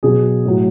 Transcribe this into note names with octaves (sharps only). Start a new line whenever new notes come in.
B2 F#3 G#4
A2 F#3